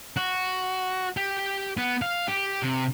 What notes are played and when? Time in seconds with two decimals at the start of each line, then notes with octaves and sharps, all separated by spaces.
0.17 F#4
1.17 G4
1.77 B3
2.02 F5
2.28 G4
2.62 C3